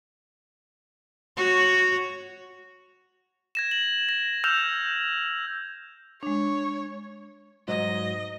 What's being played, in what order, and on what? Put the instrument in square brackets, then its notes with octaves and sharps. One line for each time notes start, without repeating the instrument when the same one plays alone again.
[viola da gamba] F#4 C#5
[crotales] G#6 A#6 E7
F#7
A#6
E6 F6 G6 G#6 E7 F7
[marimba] G#3 D4 [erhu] C#5
[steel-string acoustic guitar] G#2 F#3 [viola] D#5